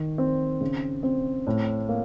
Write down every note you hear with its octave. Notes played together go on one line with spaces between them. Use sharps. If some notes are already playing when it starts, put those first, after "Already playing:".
Already playing: D#3
C4
C#3
C4
A2
A#3